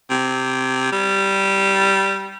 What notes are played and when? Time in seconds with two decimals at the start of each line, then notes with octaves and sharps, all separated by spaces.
0.10 C3
0.92 G3